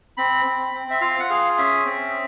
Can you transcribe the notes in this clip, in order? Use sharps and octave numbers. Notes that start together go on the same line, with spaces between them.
C4 B5
C4
C4
E5
F4 F5
F#5
G#4 F5
C#4 E5
C4